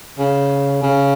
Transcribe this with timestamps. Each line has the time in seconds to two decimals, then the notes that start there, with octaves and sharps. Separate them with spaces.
0.19 C#3
0.83 C#3